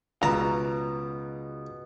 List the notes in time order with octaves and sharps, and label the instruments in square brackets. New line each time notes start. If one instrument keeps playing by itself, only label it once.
[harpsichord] C#2 A5 [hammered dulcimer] B2 [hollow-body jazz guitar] A#5